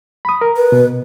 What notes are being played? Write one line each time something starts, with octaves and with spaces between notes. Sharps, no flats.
B5 D#6
A#4
B4
B2